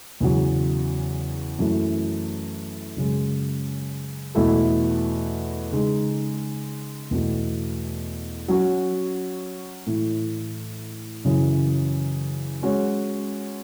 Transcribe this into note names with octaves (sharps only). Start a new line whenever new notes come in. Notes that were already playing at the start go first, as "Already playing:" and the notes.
E2 C#3 F#3
F#2 E3 A3
F#2 C#3 G#3
E2 B2 A3 E4 A4
C#3 G#3 D#4 G#4
E2 B2 A3
F#3 C#4 F#4
A2 E3 A3
F#2 C#3 E3
G#3 C#4 F#4 C#5